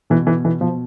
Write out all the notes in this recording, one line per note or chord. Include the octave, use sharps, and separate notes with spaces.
B2 E3
E3
E3
B2 F3